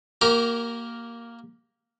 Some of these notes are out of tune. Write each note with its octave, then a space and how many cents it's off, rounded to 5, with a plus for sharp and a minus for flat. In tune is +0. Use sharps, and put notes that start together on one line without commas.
A#3 +0 G4 -40 A#4 +0